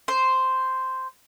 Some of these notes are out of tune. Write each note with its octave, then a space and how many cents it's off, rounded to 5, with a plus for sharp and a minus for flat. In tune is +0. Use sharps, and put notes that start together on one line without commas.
C5 -5